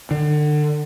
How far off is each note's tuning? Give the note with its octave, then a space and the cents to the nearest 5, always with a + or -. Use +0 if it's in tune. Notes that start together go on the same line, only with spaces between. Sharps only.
D3 +35